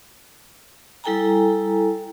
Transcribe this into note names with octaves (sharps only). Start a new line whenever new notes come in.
G3 E4 A4 G5 G#5 A#5